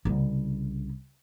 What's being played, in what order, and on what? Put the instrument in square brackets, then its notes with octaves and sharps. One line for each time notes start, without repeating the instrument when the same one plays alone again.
[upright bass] C2 C#3